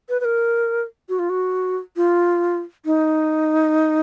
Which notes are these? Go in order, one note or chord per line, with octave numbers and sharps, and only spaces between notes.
B4
B4
A#4
F#4
F4
F#4
F4
D#4